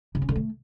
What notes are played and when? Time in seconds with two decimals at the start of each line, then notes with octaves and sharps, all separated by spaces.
0.15 C#3
0.22 C#4
0.29 D3
0.36 A3